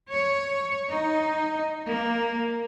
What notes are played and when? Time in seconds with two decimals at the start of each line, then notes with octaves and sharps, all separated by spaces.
0.11 C#5
0.91 D#4
1.87 A#3